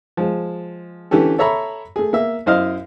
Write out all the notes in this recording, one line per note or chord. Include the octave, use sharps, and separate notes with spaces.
F3 G#3
D3 E3 C#4 G4 A4
A4 C#5 E5 A#5 B5
A3 G#4
A#3 E5
F#2 E4 C5 D#5 F5 F6